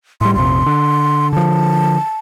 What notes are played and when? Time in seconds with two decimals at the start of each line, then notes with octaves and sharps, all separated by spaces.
0.21 A2 G3 C6
0.35 A#1 F2 C3 C6
0.66 D3
1.33 D3 F3 A5